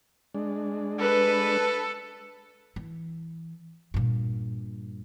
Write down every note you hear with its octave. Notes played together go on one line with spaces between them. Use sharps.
G#3 D4
A4 B4
E3
G2 A#2